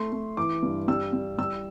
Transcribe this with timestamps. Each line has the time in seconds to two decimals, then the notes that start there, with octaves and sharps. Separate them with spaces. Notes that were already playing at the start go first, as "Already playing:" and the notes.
Already playing: A3 C6
0.12 A3
0.37 E3 D6
0.63 G2
0.88 G3 E6
1.13 G3
1.38 G3 E6